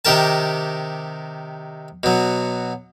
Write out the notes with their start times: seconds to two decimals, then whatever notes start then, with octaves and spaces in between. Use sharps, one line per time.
0.05 C3 D#3 G4 A#4 A5
2.03 B2 F#3